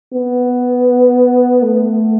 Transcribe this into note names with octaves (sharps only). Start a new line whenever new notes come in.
B3
A3